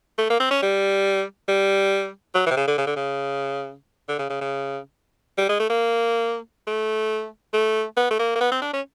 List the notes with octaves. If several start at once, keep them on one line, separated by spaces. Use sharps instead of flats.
A3
A#3
C4
C#4
G3
G3
F#3
E3
C3
C#3
D3
C#3
D3
C#3
D3
C#3
C#3
C#3
G3
G#3
A3
A#3
A3
A3
B3
A3
A#3
A#3
B3
C4
D4
C#4